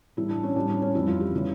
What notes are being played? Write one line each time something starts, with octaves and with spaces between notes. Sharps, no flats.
A2 E3 G3 E4
D4
C#4
A2 G3 D4
C#4
C#4
F2 E3 G3 E4
F4
G4
C#3 E3 G3